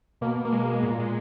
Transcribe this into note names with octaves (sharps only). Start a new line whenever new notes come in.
B2 A#3
A#3
G#3
A#2 G#3
G#3